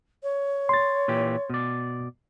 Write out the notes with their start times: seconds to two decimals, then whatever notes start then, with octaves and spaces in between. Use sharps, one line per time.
0.23 C#5
0.69 C6 A6
1.08 A#2 E3 G4
1.50 B2 D5